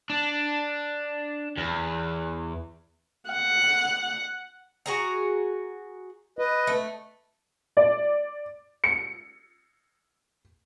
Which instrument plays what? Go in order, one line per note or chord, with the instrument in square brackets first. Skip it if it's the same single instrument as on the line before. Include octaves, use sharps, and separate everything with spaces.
[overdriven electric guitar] D4
E2
[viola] F#5
[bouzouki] F#4 G#4 A#5
[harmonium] B4 D#5
[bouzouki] A3
[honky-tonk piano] D5
C#7